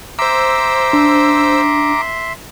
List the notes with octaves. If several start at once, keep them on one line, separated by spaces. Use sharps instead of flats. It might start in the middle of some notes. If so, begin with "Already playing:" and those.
C5 E5 A#5 C6 D6 E6
D4